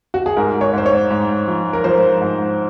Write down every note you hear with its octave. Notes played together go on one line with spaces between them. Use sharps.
F#4
G#4
G#2 A#4
C#5
G#2 C5
C#5
G#2
F3
A#4
F3 C5
G#2